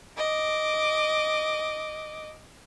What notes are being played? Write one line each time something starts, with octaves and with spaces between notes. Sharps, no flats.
D#5 D6